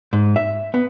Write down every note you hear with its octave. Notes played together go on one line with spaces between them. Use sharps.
G#2
E5
B3